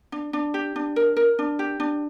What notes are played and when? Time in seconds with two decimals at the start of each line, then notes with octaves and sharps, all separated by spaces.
0.12 D4
0.33 D4
0.54 G4
0.76 D4
0.96 A#4
1.17 A#4
1.39 D4
1.59 G4
1.80 D4